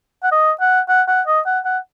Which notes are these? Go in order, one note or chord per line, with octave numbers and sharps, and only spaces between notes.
F#5
D#5
F#5
F#5
F#5
D#5
F#5
F#5